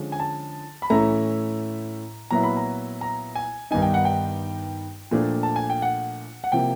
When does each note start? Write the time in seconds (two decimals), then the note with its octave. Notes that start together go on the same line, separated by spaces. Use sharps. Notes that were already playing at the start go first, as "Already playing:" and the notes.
Already playing: D3 F3 G#3 C#4
0.12 G#5
0.20 A5
0.82 B5
0.90 A2 E3 A3 C#4 E4 A#5
2.31 A#2 F#3 B3 E4 A#5
2.43 B5
2.57 A#5
3.01 A#5
3.35 G#5
3.71 G2 D#3 G3 B3 D#4 G#5
3.82 G5
3.94 F#5
4.05 G5
5.11 A#2 F3 A3 D4
5.43 A5
5.56 G#5
5.70 G5
5.82 F#5
6.44 F#5
6.52 C3 F3 A#3 G5